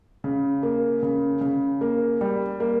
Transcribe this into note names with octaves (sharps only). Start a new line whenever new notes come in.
C#3
A#3
C#3
C#3
A#3
G3
A#3